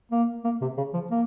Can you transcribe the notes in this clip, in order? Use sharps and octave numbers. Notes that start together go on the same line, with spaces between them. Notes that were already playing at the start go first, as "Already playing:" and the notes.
A#3
A#3
C3
C#3
F3
A#3